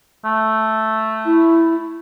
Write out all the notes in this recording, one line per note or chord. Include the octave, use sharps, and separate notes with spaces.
A3
E4